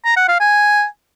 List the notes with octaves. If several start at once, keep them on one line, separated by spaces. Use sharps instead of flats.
A#5
F#5
F5
G#5